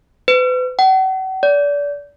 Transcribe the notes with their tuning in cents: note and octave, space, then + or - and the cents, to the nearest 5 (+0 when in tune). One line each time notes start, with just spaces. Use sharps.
B4 +35
F#5 +40
D5 -30